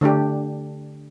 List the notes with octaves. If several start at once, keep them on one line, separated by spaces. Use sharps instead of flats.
D3 A3 D4 G4